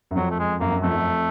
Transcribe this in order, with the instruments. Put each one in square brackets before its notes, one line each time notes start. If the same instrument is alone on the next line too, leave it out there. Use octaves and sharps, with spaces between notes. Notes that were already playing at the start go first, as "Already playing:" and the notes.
[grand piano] F#2
[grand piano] F2 [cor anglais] F#3
[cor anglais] A3
G#3
[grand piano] F#2 [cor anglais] A#3
[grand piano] F#2
[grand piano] F2 [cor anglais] A3
[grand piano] F2